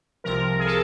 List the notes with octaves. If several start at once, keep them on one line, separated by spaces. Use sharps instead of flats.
C2 C3 F3 A#4
G#4
A4